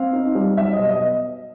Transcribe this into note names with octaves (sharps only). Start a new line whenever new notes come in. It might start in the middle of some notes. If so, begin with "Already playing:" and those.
Already playing: C4 F5
D#4
G3
F#3 E5
D#5
B2
D#5